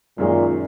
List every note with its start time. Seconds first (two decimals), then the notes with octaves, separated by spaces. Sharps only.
0.18 F#2 A#2 D#3 G#3 C#4 G#4